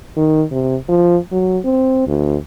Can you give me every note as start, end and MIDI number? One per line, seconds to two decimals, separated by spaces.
0.17 0.43 51
0.51 0.76 48
0.88 1.17 53
1.32 1.58 54
1.65 2.05 60
2.07 2.36 38